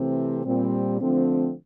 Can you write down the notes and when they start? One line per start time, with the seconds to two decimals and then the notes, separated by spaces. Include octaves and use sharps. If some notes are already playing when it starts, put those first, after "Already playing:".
Already playing: C3 E3 A3 C4
0.45 A#2 G3 C4
1.00 D3 F3 A3 C4